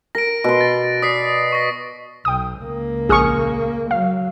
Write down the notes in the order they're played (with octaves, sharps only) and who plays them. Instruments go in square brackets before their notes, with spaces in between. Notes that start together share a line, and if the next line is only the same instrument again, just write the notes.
[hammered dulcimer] A#4 [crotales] A#6 D7
[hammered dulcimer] B2 C6
[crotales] A6
[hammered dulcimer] D5 [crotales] D#6 B6 C7
[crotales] C#6 A#6
[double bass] B1 [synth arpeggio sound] G5 D#6
[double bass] C#2 A#3
[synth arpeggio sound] A#1 D#6 F6 [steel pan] G#4 C#6
[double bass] F#3 [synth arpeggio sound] F5